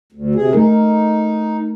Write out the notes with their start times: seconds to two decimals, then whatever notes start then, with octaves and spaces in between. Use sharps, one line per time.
0.12 D2
0.35 C3 G#4
0.53 A3 D#4 A#4